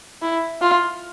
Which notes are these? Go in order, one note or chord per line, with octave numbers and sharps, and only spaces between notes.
E4
F4